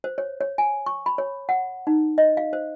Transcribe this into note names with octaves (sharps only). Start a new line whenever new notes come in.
C5
C#5
C#5
G#5
C#6
B5
C#5
F#5
D#4
D#5
F5
C5